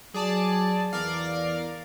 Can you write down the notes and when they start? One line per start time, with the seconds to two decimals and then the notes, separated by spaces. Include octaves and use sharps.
0.14 F#3 G#4 D5 A5
0.93 E2 A#4 D5 F5